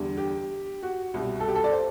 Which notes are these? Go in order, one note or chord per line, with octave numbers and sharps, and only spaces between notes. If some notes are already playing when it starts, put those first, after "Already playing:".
Already playing: E2 D3 G3
G4
F#4
C2 B2 G3
A4
G4
A4
D5
C5